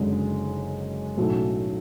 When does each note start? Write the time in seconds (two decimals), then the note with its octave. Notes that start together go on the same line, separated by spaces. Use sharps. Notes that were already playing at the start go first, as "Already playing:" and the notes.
Already playing: F#1 F#2 D3 G#3
1.17 B1 A2 F#3 A3 C#4